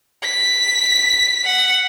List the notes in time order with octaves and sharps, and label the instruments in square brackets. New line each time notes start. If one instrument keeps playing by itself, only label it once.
[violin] B6
[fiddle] F#5